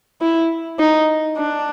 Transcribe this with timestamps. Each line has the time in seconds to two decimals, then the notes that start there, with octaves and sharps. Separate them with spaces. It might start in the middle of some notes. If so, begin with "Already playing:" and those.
0.21 E4
0.79 D#4
1.37 D4